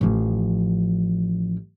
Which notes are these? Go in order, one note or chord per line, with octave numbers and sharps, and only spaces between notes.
A1 F3